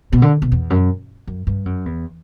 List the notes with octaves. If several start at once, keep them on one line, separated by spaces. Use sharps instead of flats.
B2
D3
B2
E2
F#2
F#2
G2
F#2
E2